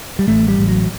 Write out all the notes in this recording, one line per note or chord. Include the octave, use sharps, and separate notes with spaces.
G3
A1 A3
G3
A1
F#3